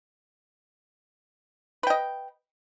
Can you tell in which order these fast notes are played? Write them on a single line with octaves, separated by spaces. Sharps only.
B4 G5 D#5